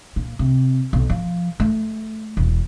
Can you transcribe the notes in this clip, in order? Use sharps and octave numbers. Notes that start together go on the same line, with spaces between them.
A#2
C3
B1
F3
A3
E1